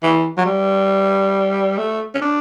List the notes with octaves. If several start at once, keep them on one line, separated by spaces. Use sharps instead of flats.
E3
F#3
G3
A3
C#4
D4